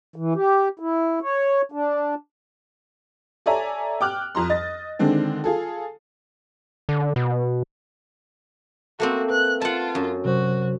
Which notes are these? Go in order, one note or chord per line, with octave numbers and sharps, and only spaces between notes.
E3
G4
E4
C#5
D4
A4 C#5 D5 E5 G#5 A#5
G5 D6 F6 F#6
F2 A#5 C6
D#5 A6
D3 D#3 G#3 C4 D4
F4 G#4 A4
D3
B2
A3 A#3 C4 F#4
B4 F#6
F4 F#5 A5
F#2
C3 F#3 F#4 C5